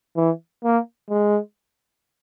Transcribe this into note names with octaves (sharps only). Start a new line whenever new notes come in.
E3
A#3
G#3